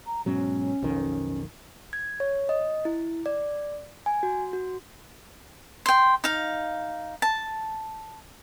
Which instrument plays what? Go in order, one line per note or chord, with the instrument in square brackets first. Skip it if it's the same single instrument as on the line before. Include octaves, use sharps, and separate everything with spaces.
[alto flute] A#5
[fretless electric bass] G#2 B2 F#3 [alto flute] C#4
[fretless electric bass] B1 F2 D#3
[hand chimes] G#6
C#5
D#5
E4
D5
G#5
F#4
F#4
[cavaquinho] G5 C6
D#4 F5
A5